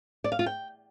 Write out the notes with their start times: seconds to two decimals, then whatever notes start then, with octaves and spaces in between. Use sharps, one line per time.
0.24 D5
0.32 F5
0.39 F4
0.46 G5